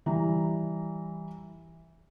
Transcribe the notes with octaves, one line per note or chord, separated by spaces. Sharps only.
E3 G3 A#5